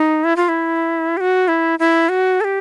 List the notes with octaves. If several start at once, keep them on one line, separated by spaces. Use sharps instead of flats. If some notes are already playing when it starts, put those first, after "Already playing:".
Already playing: D#4
E4
F4
E4
G4
F#4
E4
E4
F#4
A4
G4